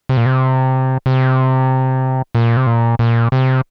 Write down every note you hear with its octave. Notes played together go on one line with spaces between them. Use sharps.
C3
A#2
C3
C3
A#2
C3
A#2
A#2
C3